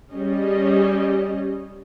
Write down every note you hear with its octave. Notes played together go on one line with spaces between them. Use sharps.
G3 C#4 G#4 D#5